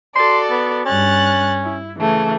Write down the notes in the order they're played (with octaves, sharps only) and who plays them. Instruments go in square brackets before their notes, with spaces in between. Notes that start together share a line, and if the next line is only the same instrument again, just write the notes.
[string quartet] F#4 A4 D5 [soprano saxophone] C6
[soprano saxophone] B3
[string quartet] G2 F#6 A6 [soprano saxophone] C#4
[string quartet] E4
C#3 E3 A3